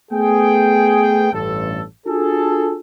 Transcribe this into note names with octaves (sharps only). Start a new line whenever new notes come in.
A3 B3 G#4 G5
A1 G2 A4
D4 F4 F#4 G#4 A4